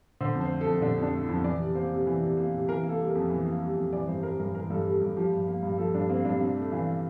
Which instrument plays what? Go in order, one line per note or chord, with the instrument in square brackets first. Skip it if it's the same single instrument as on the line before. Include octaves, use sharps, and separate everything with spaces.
[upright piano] D3 C5
F2
C5
A3
A4
F2
D3 D4
F2
D4
A3
E4
F2
E3 D5
C3
A#3 C5
C3
E3
C3
A#3
C3
E3 A#4
A#3
A4
G3
A#4
F2
E3
A#3
G3
F2
E3 D5
G2 C5
G3 A#4
G2 A#4
E3 A#4
G2 A4
G3 A4
G2 G4
F3 G4
G2
A#3
G2
F3 A4
G2 D4
A#3 C4
G2 D4
C3 D4
A3
E3 F4